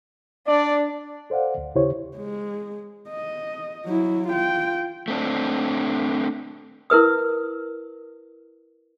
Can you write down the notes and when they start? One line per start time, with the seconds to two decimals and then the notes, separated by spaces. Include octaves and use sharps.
0.47 D4 D5
1.30 A4 C5 D5 F5 F#5
1.58 D2
1.75 D#2 C#3 E4 G4 C5 C#5
2.16 G#3
3.10 D#5
3.86 F#3 E4
4.28 F4 G5
5.08 A3 C4 D4
6.90 E4 A#4 B4 D#6